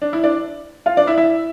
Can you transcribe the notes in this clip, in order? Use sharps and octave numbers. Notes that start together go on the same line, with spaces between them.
D4
E4
D4 D5
F4 F5
D4 D5
E4 E5
E4 E5